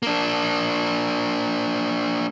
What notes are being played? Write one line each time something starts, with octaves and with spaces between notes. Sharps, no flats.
A#3 D4